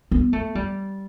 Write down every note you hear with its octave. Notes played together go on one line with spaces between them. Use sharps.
B3
A3
G3